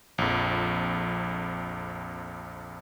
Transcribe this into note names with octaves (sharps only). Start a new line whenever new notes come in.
A#1 F2